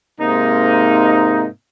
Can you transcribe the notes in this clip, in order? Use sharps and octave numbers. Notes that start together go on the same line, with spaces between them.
G#2 C3 A#3 D#4